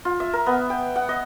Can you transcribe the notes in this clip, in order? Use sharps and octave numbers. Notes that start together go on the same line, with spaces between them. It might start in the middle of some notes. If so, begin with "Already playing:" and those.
F4
E5
A#4
B3
G5
F#5
D#5